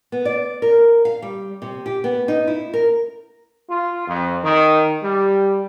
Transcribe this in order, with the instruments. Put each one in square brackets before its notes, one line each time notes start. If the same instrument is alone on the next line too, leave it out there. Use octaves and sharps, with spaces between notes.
[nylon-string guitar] B3
D5
A#4
F5
G3
C3
G4
B3
D#4
E4
A#4
[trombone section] F4
F2
D#3
G3